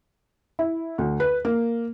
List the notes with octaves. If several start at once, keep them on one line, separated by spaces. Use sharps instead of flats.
E4
D2
B4
A#3